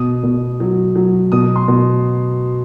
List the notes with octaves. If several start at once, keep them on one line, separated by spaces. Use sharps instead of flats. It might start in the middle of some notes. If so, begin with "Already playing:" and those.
Already playing: B2 D#6
B2
F#3
F#3
B2 D#6
C6
B2